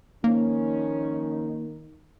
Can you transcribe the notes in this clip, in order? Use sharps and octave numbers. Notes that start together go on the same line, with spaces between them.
D#3 F3 A#3 C#4